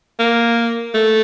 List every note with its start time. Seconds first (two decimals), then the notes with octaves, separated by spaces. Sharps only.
0.20 A#3
0.95 A3